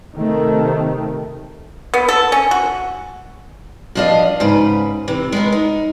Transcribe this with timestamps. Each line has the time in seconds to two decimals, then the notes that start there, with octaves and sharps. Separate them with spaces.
0.17 C3 D#3 A3
1.94 B3
2.08 A4
2.32 C#4
2.51 F#4
3.95 G2 F3 D4 D#5 F5
4.40 G#2 C#3 B4
5.08 C3 E3
5.32 G#3 B3 A#4
5.52 D#4